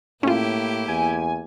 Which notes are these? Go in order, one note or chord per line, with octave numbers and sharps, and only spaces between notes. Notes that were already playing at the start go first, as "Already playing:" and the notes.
A2 A#3 C#4 E4 F4 G4
E2 G#5